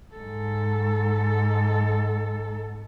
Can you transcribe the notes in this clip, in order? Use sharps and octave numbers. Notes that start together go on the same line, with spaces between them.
G#2 A4